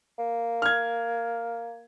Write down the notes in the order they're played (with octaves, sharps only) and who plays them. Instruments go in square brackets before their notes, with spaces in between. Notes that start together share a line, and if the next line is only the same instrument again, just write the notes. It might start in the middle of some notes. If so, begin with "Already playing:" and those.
[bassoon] A#3
[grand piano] F6 G#6